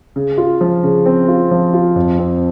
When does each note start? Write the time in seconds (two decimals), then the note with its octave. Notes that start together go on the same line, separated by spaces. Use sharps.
0.16 C#3
0.38 F4
0.61 F3
0.83 C#3
1.06 C4
1.28 F4
1.51 F3
1.74 F4
1.96 F2
2.19 C4